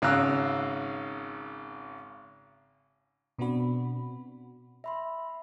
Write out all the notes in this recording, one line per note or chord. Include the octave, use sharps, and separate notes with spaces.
G#1 C#3 F5 A#5 E6 F#6
B2 B3 C4 D4 F#4 B5
E5 B5 C6